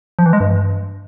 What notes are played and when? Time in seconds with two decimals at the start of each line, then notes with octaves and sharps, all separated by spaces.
0.19 F3
0.26 E3
0.33 G#3
0.40 G2